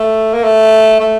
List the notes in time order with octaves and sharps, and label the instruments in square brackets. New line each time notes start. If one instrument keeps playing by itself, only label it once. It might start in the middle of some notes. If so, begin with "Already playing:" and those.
Already playing: [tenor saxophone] A3
A#3
A3
A3